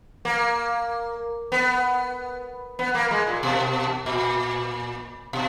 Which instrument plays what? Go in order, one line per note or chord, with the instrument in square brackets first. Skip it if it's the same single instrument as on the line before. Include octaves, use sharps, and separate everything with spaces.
[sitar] A#3
B3
B3
A#3
G#3
A#2
B2
A#2
B2